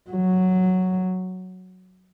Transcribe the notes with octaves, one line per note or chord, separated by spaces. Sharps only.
F#3